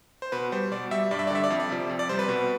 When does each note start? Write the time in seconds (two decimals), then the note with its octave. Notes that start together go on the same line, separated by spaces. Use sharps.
0.22 C5
0.32 B2 B4
0.52 G3 C5
0.71 B2 D5
0.91 G3 E5
1.11 G2 D5
1.19 E5
1.27 D5
1.30 D3 G3 E5
1.44 D5
1.50 F2 E5
1.60 D5
1.70 C3 F3
1.89 F2
1.99 D5
2.09 C3 G3 C5
2.19 B4
2.29 B2